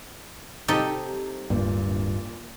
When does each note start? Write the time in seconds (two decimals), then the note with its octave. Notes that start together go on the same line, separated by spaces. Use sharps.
0.68 C3 G3 D#4 G4 A4
1.50 D1 G2 A#2